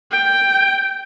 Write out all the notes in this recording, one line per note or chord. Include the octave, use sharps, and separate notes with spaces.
G5